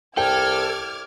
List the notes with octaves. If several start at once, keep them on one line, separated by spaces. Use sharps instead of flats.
C2 A4 G5 D6 F6 G#6